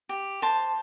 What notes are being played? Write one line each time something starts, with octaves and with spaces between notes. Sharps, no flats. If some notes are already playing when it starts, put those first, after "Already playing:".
G4
C5 A5